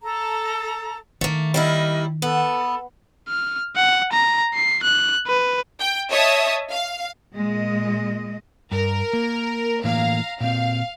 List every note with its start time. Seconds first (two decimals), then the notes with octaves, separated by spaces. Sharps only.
0.01 A4 A#5
1.21 D#3 A3 A#3
1.54 G3 A#3 E4 D#5 F6
2.22 B3 A4
3.28 F6
3.76 F#5
4.13 A#5
4.54 C7
4.83 F#6
5.27 B4
5.80 G5
6.09 C#5 D#5 E5 A5 D#6
6.71 F5
7.34 A#2 G#3 D#5
8.71 G2 A#4
9.13 A#3
9.84 A2 E3 A#3 F5 A#5
10.41 A#2 C4 F5